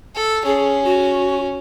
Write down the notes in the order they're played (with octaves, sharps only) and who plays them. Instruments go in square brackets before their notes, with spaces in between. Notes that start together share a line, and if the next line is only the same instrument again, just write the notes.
[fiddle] A4
[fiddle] C#4 [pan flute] G#4
[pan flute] F#4